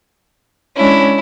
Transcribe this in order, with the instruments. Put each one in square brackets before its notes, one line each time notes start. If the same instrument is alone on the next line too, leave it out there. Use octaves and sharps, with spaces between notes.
[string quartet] G#3 C#4 D4 [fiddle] E4